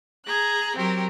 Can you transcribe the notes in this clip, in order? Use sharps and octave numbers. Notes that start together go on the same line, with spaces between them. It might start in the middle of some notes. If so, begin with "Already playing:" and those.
G#4 A#5 F#6
F#3 C4 G4 A#4